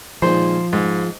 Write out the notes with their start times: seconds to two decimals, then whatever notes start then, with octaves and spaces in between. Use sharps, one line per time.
0.22 A#2 D#3 F3 G#3 C5
0.73 G#2 G#3